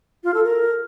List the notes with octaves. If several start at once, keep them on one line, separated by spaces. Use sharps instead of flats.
F4
A4
A#4